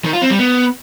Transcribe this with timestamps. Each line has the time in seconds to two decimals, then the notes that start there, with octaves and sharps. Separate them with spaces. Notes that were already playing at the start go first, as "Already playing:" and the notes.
0.04 D#3
0.13 F4
0.22 C4
0.30 G3
0.39 B3